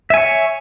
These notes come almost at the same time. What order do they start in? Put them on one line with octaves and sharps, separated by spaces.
E5 G#5 C#5